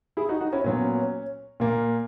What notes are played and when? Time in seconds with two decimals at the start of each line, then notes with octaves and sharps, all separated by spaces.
0.17 E4 G#4
0.29 D#4 F#4
0.41 D#4 F#4
0.53 C#4 E4
0.64 A#2 F#3 B3 C#4
1.60 A#2 A#3